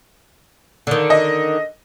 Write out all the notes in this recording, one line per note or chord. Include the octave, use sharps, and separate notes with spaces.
D3 D#3
D#5